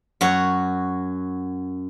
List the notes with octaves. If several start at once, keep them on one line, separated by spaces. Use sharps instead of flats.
F#2 F#4 C#5